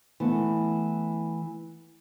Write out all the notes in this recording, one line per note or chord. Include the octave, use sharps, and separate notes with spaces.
E3 A3 B3